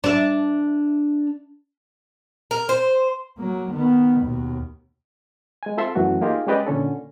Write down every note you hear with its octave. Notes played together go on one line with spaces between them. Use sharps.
D4 E5
A#4
C5
F#3 A#3
D#3 B3
D#2 B2
G#3 G#5
C4 F4 A4 E5 C6
F#2 E3 F#3 A3 F#4
A#3 D#4 F4 G4 G#4 A#4
G#3 C#4 G4 B4 D5 D#5
A#2 D3 C#4 A4